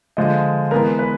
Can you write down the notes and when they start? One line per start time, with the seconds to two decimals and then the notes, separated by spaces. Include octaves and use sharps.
0.17 D3 F3 G#3 D#5
0.71 E3 G#3 B3 A#4
0.99 B4